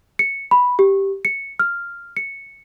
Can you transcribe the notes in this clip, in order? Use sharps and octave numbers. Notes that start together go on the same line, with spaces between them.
C#7
B5
G4
C#7
F6
C#7